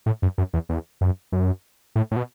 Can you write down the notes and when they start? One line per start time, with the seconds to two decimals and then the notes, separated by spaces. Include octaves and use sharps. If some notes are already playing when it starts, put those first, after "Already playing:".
0.06 A2
0.22 F#2
0.38 F#2
0.54 E2
0.69 E2
1.01 F#2
1.32 F#2
1.95 A2
2.11 A2
2.16 B2